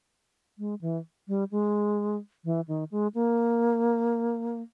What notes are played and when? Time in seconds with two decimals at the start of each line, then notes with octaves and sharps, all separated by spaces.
0.58 G#3
0.81 E3
1.28 G3
1.52 G#3
2.45 E3
2.68 D#3
2.91 G#3
3.14 A#3